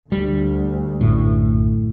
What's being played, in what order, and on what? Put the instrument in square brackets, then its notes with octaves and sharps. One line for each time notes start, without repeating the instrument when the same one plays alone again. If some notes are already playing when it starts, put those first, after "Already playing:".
[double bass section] D2 [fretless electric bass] G3
[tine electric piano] A#1 F#2 [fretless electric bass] A2